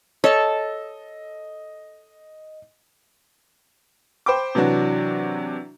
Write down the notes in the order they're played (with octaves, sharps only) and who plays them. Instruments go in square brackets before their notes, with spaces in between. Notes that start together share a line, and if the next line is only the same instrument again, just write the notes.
[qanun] A4 A5 [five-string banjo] C#5 [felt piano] D#5
[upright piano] C5 G5 B5 D6
C3 E3 F#3 D4 F#4